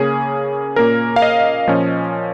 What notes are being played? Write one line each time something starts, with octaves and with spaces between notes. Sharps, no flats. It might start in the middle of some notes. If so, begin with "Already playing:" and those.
Already playing: C#3 A#3 C#4 G#4
A#2 A#3 C#4 A#4
F5
D#5
A#2 F3 C#4